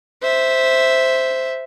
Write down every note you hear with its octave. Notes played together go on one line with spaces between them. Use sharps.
C5 E5